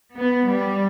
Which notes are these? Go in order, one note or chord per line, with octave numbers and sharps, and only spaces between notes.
B3
G3